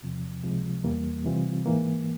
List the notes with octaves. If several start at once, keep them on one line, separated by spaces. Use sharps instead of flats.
E2 C3 F3
C#2 C3 F3 G#3
E2 E3 G3 A#3
C3 E3 G3 C4 F4
G#2 E3 A#3